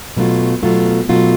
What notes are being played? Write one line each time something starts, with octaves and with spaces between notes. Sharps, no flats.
B2 F#3 A3 F4
B2 F#3 A3 F4
B2 F#3 A3 F4